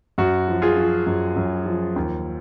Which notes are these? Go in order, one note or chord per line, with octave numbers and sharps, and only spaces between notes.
F#2 F#4
F3
F4 G#4
F3
F#2
F#2
F3
D#2